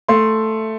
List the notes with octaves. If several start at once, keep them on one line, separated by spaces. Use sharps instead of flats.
A3 C6